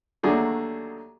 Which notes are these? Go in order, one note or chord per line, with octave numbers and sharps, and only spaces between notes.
D#2 D3 F#3 A3 D4 F#4 G#4